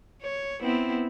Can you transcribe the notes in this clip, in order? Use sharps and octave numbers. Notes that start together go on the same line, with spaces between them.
C#5
B3 C4 E4